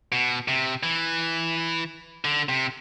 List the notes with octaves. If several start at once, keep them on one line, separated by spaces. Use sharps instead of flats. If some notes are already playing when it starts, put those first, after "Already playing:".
B2
C3
E3
D3
C3